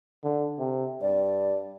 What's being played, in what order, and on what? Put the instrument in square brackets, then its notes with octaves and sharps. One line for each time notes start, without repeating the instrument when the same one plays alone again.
[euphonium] D3
C3
[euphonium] G2 [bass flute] D5